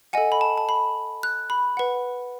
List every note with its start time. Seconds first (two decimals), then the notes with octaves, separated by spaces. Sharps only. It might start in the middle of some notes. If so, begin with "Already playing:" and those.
0.13 A4 D#5 F#5 G#5
0.32 B5
0.41 A5
0.58 A5
0.69 B5
1.23 F#6
1.50 B5
1.77 B4 F#5